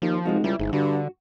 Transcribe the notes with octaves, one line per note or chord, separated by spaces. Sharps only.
D#2 F3
F1 G#3 D#4 F#4
C#2 G3 E4
G1 G#2
G2 D3 F#4